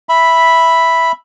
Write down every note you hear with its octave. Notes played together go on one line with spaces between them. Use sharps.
E5 B5